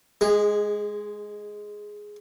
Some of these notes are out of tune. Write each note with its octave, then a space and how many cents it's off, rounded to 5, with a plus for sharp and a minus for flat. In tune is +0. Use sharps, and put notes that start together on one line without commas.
G#3 +0 G#4 -30